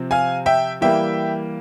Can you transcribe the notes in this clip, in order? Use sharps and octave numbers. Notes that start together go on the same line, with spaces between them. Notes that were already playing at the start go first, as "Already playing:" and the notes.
Already playing: C3 F3 C4
F5 G#5
E5 G5
E3 G3 A#3 E5 G5